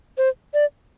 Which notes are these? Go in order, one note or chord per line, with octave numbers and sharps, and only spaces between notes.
C5
D5